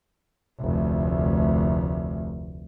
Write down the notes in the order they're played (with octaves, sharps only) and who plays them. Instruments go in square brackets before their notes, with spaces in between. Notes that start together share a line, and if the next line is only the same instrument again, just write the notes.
[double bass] F1 D2